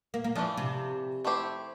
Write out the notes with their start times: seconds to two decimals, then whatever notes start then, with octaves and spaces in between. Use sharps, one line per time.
0.14 A#3
0.24 A#3
0.35 E3 F3 A3 D4
0.57 C3
1.25 A3 E4 G4 C5